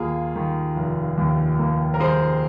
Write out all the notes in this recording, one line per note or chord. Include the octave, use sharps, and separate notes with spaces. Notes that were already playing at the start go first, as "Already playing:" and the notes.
Already playing: D#2 A#3 F4 G#4
D#3
F1
D#2
A#3
A#4
D#3 G#4 C5